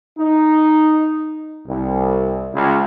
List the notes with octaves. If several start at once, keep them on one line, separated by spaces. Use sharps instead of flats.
D#4
C2
C#2